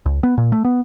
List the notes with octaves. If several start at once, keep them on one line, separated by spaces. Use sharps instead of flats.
C#2
B3
A#2
A3
B3